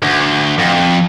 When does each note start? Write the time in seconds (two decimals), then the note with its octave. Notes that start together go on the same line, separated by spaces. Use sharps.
0.02 D2
0.59 F2